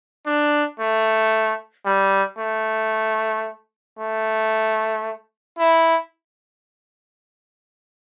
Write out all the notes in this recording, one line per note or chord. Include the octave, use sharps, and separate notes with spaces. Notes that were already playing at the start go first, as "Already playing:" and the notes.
D4
A3
G3
A3
A3
E4